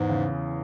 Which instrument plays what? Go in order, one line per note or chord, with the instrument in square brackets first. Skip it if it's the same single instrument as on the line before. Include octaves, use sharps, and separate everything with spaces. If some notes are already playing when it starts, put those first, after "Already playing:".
Already playing: [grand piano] E2 [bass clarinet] G#2
[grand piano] C#3